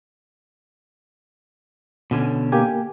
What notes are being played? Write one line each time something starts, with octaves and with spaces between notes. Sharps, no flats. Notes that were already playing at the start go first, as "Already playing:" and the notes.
B2 D3 C#4
A#3 G4 G#5